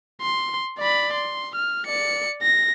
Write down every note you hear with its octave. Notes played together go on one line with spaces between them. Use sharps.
C6
D5 B5
C6
F6
D5 C#7
A#6